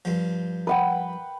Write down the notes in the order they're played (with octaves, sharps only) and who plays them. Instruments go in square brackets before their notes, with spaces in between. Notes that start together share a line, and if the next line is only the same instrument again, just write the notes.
[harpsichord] G2 F3
[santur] B4 F#5 G5